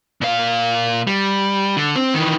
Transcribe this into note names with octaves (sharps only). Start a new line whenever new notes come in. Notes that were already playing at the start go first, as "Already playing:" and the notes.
A#2 F5
G3
D3
C4
D#3 E3